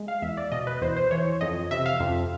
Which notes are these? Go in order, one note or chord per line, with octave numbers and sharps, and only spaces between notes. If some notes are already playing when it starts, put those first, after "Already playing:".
Already playing: G#3
F5
E2 E5
D5
B2 D#5
B4
E2 C5
C5
E3 C#5
F2 D#5
C3 E5
F5
F2